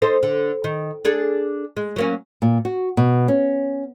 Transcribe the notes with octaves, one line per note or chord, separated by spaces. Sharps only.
D#4 A4 C5
D3
D#3
D4 G#4 A4
G#3
F#3 A#3 C#4
A#2
F#4
B2
C#4